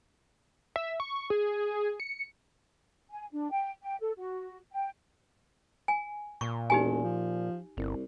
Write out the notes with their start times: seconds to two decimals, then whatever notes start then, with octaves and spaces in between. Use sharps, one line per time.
0.76 E5
1.00 C#6
1.30 G#4
2.00 C#7
3.10 G#5
3.33 D4
3.51 G5
3.82 G5
4.01 A4
4.18 F#4
4.72 G5
5.88 G#5
6.41 A#2 C#6
6.70 E1 D#4 G4 G#5
7.04 F3
7.77 G1 C2